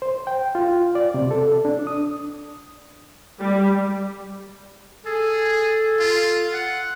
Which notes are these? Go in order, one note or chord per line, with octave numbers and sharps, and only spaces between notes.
C5
G5
F4
D5
C3
A4
D4
D#6
G3
G#4 A4
F4
F#5